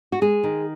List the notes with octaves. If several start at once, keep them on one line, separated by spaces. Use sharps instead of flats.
F#4
G#3 G#4
D#3